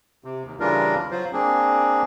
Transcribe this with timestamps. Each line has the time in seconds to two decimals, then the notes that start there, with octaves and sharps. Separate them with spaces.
0.24 C3
0.44 D#2
0.60 C#3 E3 G3 D4 F4 A#4
1.11 F#3 F4 C5
1.33 A#3 C4 D4 G#4